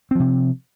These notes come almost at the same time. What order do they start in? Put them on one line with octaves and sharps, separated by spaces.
C4 F3 C3